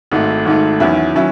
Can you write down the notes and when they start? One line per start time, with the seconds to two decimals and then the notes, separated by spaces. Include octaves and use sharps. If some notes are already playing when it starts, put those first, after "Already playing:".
0.12 G#1 G#2 D#3 A3
0.45 G#1 G#2 D#3 A3
0.80 E2 D#3 F#3 C#4 E4
1.15 D#3 F#3 C#4 E4